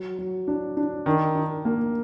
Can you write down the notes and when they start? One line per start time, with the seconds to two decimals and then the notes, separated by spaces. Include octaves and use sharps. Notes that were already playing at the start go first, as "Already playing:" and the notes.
Already playing: F#3
0.19 F#3
0.48 D4
0.77 D4
1.06 D#3 D4
1.35 D4
1.65 A#3